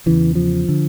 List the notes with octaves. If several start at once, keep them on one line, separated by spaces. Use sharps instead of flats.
E2 C#3 E3
F3
D3